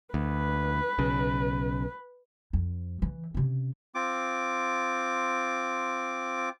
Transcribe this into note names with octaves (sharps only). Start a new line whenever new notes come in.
D2 B4
B1 C#3
F2
E3
C3 C#4
C4 F4 D6